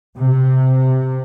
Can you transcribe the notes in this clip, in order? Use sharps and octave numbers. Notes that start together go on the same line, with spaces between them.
C3